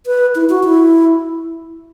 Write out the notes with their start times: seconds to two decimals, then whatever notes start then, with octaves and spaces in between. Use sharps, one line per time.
0.06 B4
0.35 E4
0.49 F#4
0.64 E4